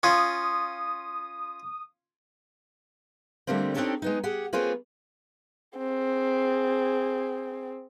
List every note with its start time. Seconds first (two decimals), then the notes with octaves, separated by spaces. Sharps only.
0.03 C#4 F4 D#6
3.47 D3 G3 A3 A#3 C4
3.74 C4 D4 D#4 G4 A4 C#5
4.02 G#3 B3 D#4
4.23 G4 G#4 F#5
4.53 A#3 C4 F4 G#4 B4 C#5
5.78 C4 G#4